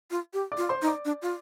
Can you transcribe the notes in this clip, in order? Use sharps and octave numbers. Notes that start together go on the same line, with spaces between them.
F4
G4
D5 D6
F4
C5 C6
D#4
D5 D6
D4
F4